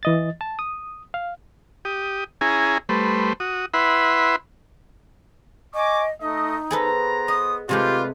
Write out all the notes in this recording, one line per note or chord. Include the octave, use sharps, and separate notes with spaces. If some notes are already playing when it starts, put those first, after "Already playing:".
E3 D#5 A6
A5
D#6
F5
G4 D#6
C#4 E4 G#4 G#5 A#5
G3 A3 B4 C5
F#4 D#6
E4 B4 E5 F#5 B5 C6
D#5 G#5 C#6 D6
A3 D#4 D#5
B3 G#4 A4 B4 C5 A#5
D#5 D#6
C3 G#3 A3 F4 G4 B4 D5